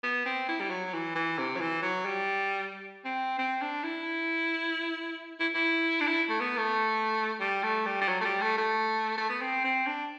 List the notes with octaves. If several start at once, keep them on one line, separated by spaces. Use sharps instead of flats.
B3
C4
E4
G3
F#3
E3
E3
C3
F#3
E3
F#3
G3
C4
C4
D4
E4
E4
E4
D4
E4
A3
B3
A3
G3
A3
G3
G3
F#3
A3
G3
A3
A3
A3
B3
C4
C4
D4